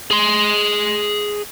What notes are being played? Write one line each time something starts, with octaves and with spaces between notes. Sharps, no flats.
G#4 C6